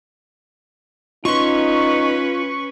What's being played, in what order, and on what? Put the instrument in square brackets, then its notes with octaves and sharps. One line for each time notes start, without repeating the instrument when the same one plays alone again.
[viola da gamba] C#4 B4 [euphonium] D#4 [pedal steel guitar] F4 C6 [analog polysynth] C#6